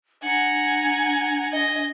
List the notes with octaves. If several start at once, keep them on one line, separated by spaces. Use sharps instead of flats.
D4 F#5 G#5 A#5
D#5